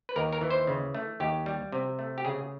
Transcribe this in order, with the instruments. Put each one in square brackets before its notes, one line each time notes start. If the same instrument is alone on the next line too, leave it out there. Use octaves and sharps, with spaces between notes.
[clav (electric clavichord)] B4
D#2 A#4
A#4
E3
C5
C#3
A3
D#2 G4
G3
C3
A3
G4
C#3 G#4